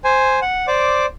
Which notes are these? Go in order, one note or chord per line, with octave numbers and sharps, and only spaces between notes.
C5 G#5
F#5
C5 D5 D6